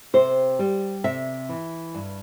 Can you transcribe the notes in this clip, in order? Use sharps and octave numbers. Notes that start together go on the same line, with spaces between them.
C3 C5
G3
C3 E5
E3
G2